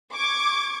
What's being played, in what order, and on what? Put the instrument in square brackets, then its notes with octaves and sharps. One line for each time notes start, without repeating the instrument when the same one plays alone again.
[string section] C#6 D6 G#6